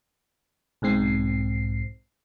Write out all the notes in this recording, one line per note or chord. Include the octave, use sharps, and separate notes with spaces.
B1 G#2 C4 C7